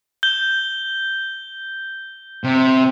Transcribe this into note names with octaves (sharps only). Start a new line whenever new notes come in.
G6 G7
C3